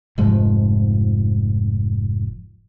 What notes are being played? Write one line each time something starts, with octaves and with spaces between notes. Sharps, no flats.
F1 G#2 F3